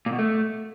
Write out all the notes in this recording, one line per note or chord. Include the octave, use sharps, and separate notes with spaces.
A#2
B2
A3